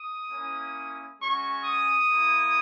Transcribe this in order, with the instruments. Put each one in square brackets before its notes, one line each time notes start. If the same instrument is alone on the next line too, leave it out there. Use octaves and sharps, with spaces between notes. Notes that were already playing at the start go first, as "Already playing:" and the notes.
Already playing: [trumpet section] D#6
A#3 C#4 E4
G#3 C#4 F#4 C#6
D#6
A#3 E4